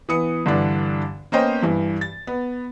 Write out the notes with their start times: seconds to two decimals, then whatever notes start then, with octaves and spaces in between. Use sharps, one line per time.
0.09 E3 B3 D#6 C#7
0.46 G2 D3 E3 D4
1.32 A#3 B3 C#4 C5 D#5 G5
1.63 G2 E3
2.01 A6
2.27 B3